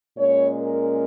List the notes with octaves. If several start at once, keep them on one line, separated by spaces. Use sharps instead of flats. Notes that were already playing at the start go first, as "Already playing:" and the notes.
A#2 G#3 C#4 C#5
A#4